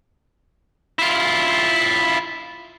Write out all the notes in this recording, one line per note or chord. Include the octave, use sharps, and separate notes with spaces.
E4 F4